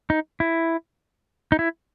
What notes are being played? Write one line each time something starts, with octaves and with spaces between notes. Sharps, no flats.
D#4
E4
D#4
E4